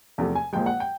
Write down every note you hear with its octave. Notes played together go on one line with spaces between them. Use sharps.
E2 C3 F3 A3
G#5
A#1 A#2 F3 G#3 G5
F#5
G5